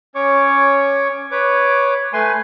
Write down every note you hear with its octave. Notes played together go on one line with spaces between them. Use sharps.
C#4 C#5 C#6 D6
B4 C#5 D6
A3 B4 G#5 C6